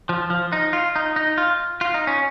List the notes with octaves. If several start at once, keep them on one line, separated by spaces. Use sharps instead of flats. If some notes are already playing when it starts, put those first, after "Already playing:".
F3
F3
D#4
F4
D#4
D#4
F4
F4
D#4
C#4